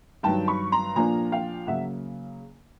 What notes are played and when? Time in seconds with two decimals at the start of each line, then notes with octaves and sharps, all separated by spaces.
0.23 G2 D#3 F#3 G5 A5
0.48 B5 C#6
0.72 A#5 C6
0.96 A#2 F3 A#3 D4 G#5 A#5
1.32 F5 G5
1.67 C#3 F#3 A#3 E5 F#5